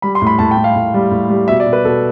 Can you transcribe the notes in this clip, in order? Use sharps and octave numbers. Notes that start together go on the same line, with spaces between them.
G3 B5
C6
A2 B5
A2 A5
G5
A2
F5
A2
G3
A2
G3
B2 E5
D5
B2
B4
B2 A4